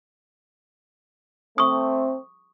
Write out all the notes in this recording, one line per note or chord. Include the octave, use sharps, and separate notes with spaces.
A3 C4 C#6 D#6